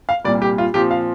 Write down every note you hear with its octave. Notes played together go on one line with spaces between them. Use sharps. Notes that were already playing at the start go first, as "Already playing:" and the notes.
F5
C2 A#2 G3 D5
G4
F4
A#2 F3 C4 G4
F5